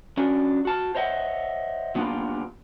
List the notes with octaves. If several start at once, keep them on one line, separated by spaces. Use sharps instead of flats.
C#4 D4 F#4
F#4 A5
C5 C#5 D#5 E5 F#5
F#3 A#3 B3 D4 F4 G4